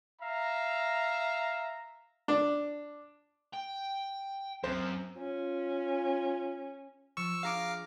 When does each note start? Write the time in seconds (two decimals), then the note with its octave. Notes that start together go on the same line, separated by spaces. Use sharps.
0.21 E5 F5 A#5
2.28 D4
3.53 G5
4.64 F#2 C4 C5
5.17 C#4 F4
7.17 F3 C#6 E6
7.43 D4 G#4 F5 A#5 D6 F6